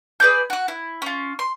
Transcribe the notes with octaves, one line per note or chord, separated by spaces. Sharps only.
G#4 B4 D5 G6
F#4 F#5
E4
C#4 F4
C6